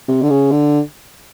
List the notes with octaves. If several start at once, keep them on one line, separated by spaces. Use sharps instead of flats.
C3
D3
C#3
D3